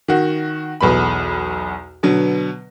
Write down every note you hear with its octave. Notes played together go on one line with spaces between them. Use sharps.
D#3 F#4
B1 E2 B3 B5
B2 D3 F#3 B3